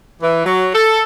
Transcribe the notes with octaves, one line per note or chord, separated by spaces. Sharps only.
E3
F#3
A4